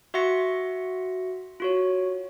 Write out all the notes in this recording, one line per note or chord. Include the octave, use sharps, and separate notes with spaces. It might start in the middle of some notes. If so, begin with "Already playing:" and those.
F#4 E5 F#5 C6 A#6 C#7
F4 F#4 C#5